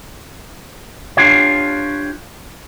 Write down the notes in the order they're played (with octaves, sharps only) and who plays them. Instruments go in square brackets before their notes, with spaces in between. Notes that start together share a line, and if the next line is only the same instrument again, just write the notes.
[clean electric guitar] D4 F4 G4 C#5